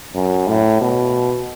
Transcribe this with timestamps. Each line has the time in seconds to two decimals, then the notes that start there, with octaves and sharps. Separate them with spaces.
0.15 F#2
0.48 A2
0.81 B2